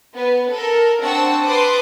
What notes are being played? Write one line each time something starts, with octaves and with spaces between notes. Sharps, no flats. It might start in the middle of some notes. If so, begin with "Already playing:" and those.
B3 B4
A4 A#4
C4 D4 F#5 A5 C#6 E6
B4 A5 C6 D6 D#6